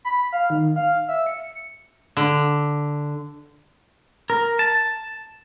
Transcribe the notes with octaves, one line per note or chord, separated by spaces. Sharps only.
B5
F5
D#3
F5
E5
C#7
D3
A#4
A5